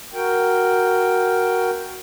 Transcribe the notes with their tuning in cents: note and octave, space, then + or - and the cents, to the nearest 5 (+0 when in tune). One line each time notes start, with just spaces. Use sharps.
F#4 +0 A#4 +0 G5 +0